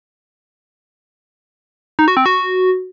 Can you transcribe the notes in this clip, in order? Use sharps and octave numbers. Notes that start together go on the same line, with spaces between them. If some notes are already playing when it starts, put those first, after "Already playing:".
D#4
F#4
C4
F#4